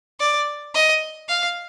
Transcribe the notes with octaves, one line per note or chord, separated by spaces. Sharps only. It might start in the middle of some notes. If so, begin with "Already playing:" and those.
D5
D#5
F5